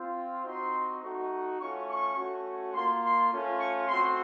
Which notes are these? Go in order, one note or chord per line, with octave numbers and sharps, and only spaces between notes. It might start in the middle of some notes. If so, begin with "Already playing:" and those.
Already playing: C4 F4
C4 D#4 F#4 C6
A3 D#4 F#4
A3 C#4 F4 C#6
C#6
A3 C#4 F#4
A#3 F4 C6
C6
A3 C#4 F4
C#6
A3 C4 F#4 C6